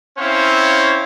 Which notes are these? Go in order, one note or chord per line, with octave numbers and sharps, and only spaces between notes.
C4 C#4 E4 C5 C#5 F5